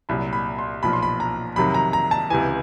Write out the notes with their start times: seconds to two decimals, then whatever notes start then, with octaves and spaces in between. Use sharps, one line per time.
0.09 C2 A#2 F#3 B5
0.33 B5
0.59 C6
0.83 B1 A#2 F3 B5
0.93 C6
1.03 B5
1.20 A#5
1.56 F2 C3 D#3 F#3 B5
1.74 A#5
1.93 A#5
2.11 A5
2.30 C#2 C3 E3 G#5